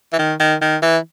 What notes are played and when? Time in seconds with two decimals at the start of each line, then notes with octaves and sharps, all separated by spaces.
0.13 E3
0.19 D#3
0.40 D#3
0.61 D#3
0.82 E3